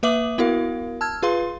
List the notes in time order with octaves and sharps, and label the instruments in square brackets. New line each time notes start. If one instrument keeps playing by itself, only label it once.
[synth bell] A#3 B4 E5 D6 D#6 F#7
B3 E4 F#4 A#4 F5
A5 E6 F6 G#6
F4 G#4 B4 F5 C6